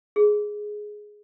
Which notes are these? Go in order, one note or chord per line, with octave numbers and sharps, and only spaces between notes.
G#4